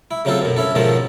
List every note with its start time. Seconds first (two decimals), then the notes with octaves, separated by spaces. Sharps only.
0.11 E4
0.25 C#3 F#3 C4 F4 A4
0.42 F#2 B2
0.56 C#4 E4 A4
0.75 G#2 B2 D#3 F3 C#4 A5